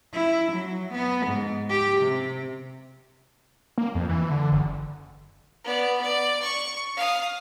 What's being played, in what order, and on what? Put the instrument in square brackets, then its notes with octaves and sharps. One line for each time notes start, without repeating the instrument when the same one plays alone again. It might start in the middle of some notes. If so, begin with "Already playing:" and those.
[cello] E4
F#3
B3
G#2
G4
C3
[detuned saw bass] A#3
F2
E3
D3
F#1
[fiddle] B3 D5
D5
C#6
F5 D#6